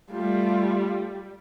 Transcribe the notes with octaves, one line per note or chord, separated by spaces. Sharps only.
G3 A3 F4